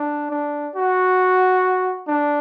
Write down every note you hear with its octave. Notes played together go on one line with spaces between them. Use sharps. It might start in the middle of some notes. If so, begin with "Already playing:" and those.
Already playing: D4
D4
F#4
D4